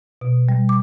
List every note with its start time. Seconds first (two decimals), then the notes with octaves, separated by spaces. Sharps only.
0.21 B2
0.49 G3
0.69 D6